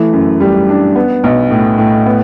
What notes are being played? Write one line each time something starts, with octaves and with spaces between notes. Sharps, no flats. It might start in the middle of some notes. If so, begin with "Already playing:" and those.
Already playing: E3 A3
F#2
G3
D4
B3
B1
A2
A2
B3